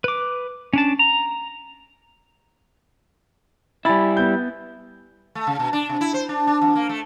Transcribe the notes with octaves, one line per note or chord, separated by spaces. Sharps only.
B4 D6
C#4 D4 A5
A#5
G3 E4 G#5 B5 A6
B3 G6
A3
C#3
B2
D4
C3
E4
C5
D4
D4
F2
A#3
A3